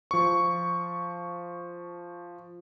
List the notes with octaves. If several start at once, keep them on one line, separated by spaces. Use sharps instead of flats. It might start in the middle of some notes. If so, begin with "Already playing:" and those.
F3 C#6